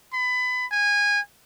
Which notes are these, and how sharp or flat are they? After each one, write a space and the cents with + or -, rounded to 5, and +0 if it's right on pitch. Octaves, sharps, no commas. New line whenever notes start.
B5 +25
G#5 -20